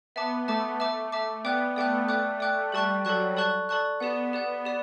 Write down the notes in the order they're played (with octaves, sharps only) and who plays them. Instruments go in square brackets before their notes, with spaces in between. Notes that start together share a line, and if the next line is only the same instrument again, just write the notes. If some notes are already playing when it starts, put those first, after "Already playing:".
[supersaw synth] B3 [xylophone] E5 A5 D6
[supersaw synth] A3 [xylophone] E5 A5 D6
[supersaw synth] A3 [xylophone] E5 A5 D6
[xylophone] E5 A5 D6
[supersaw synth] B3 [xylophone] D5 G5 D6 F#6
[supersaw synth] A3 [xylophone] D5 G5 D6 F#6
[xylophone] D5 G5 D6 F#6
D5 G5 D6 F#6
[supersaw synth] G3 [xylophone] A4 D5 A5 C#6 F#6
[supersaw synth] F#3 [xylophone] A4 D5 A5 C#6 F#6
[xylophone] A4 D5 A5 C#6 F#6
A4 D5 A5 C#6 F#6
[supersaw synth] B3 [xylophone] G4 D5 F#5
[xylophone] G4 D5 F#5
G4 D5